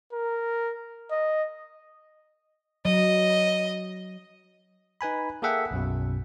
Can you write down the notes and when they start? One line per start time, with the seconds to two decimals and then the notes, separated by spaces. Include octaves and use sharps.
0.13 A#4
1.11 D#5
2.85 F#3 D#5
5.01 D#4 B4 G#5 B5
5.42 A#3 G#4 A4 E5 F#5 G5
5.71 B1 F#2 B2